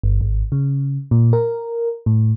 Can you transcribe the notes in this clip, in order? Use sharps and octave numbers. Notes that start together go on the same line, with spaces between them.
G1
G#1
C#3
A#2
A#4
A2